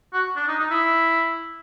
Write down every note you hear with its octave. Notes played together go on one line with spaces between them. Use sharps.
F#4
D4
D#4
D#4
E4